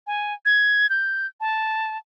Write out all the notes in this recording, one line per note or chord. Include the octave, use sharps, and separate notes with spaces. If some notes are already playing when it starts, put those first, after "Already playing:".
G#5
G#6
G6
A5